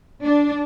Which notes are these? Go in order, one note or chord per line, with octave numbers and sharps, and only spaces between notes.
D4